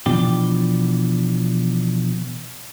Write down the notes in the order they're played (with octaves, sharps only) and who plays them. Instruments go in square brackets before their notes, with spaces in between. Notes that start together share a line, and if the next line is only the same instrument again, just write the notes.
[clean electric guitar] B2 E3 F3 D4 G4